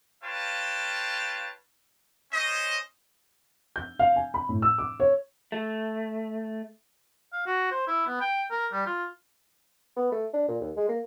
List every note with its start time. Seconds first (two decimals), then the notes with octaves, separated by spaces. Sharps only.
0.23 F4 B4 C#5 F5 G5 A5
2.32 C#4 C5 D#5
3.76 G6
3.99 F5
4.16 G#5
4.34 B5
4.49 A2
4.62 E6
4.78 D6
5.00 C#5
5.52 A3
7.33 F5
7.47 F#4
7.72 C5
7.87 E4
8.07 B3
8.21 G5
8.51 A#4
8.73 G3
8.86 F4
9.96 B3
10.12 A3
10.33 D4
10.48 A#2
10.61 D#2
10.76 G#3
10.89 A#3